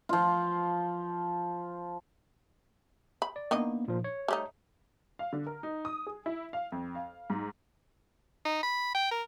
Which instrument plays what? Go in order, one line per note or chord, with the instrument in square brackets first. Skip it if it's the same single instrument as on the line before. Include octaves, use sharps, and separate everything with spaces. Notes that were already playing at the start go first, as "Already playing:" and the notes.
[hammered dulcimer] F3 F4
[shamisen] B5
[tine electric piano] D5
[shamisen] D#3 D4 D#5 [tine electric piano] A#3 B3
[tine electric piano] A#2 F3
C#5
[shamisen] G3 A3 D#4
[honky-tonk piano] F5
D3
A#4
D#4
D#6
G#4
E4
F5
F2
F5
G#2
[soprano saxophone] D#4
B5
G5
A#4